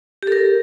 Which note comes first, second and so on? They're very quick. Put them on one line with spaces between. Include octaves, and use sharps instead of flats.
G4 A4 A#4